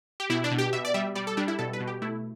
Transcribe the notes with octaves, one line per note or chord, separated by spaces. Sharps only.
G4
B2 E4
D4
B2
G4
B2 E5
D5
G3 E5
G3 D5
A4
G3 D4
E4
B2 A4
B4
B2
G4
A3 E4